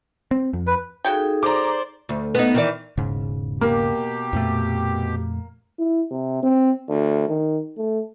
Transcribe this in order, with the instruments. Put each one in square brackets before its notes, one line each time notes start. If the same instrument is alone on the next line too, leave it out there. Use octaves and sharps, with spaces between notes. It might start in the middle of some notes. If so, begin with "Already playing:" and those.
[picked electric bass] C4
F2
[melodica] B4
[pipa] C#3 F#4 G5 [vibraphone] D#4 G#4 A4
[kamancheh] C5 D5 [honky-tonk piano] A#5 D6
[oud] D2
B3 D#4
D#3 E3 D5
[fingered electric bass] E1 G#2 C#3
[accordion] B2 G4 [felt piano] A#3
[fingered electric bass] F2 A#2 A3
[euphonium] E4
C3
C4
D2
D#3
A3